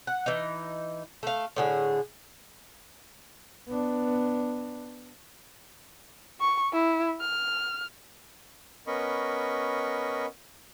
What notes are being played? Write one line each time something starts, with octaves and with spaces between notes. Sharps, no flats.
F#5
E3 D#4
A3 F5
A2 D3 G#4
B3 D4
C#6
E4
F6
B3 C#4 A#4 D#5 B5 C#6